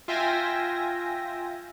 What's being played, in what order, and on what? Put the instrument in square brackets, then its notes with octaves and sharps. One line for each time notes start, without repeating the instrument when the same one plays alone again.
[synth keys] F4 E5 G5 G#5 A#6